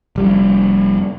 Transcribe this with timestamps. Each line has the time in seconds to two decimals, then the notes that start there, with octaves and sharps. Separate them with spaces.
0.16 F1 G3